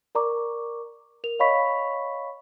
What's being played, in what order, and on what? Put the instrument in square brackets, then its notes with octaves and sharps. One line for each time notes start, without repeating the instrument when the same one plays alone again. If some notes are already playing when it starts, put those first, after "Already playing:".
[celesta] A#4 D5 A#5 C#6 D6
A#4 F7
C#5 D#5 F5 B5 C#6 B6